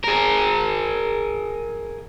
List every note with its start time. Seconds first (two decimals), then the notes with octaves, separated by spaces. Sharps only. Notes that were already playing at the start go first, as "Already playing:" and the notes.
0.04 G#4 A#4